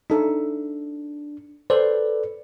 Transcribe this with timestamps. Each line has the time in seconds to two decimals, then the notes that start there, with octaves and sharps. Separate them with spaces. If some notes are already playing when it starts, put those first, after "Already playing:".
0.10 D4 D#4 A4
1.70 A4 B4 C5 D5